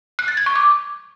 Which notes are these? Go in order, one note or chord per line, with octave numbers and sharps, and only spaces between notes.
F#6
A6
G#6
C#6
D6